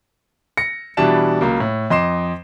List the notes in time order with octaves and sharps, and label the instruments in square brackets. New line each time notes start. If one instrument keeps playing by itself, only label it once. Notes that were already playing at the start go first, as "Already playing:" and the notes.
[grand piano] A#6 C#7
B2 E3 G3 D4 A5 E7
C#2 F#3 A#3
A2
F2 D#5 C6 D6 C7 E7